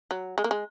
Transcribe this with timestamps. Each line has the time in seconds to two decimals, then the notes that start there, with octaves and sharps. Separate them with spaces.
0.11 F#3
0.38 G#3
0.44 A#3
0.51 G#3